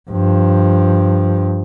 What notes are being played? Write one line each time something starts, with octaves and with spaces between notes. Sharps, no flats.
G2 F3